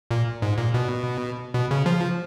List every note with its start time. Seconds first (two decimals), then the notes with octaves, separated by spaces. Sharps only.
0.11 A#2
0.42 G#2
0.58 A#2
0.74 B2
1.54 B2
1.71 C#3
1.86 F3